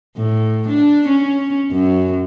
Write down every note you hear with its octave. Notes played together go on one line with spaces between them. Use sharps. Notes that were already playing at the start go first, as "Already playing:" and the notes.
A2
D4
C#4
F#2